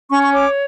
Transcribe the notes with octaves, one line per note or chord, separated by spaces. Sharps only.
C#4 C#6
C#6
C#5 D6